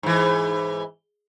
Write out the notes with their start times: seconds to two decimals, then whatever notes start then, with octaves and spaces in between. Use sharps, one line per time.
0.03 G#2 E3